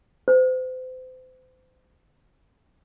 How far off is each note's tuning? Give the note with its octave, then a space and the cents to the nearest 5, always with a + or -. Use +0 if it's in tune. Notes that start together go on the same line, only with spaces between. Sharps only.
C5 -35